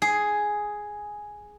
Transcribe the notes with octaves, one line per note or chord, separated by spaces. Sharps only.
G#4